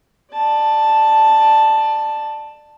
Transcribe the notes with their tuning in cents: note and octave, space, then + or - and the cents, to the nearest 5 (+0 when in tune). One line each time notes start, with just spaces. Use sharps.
D5 +30 A5 +0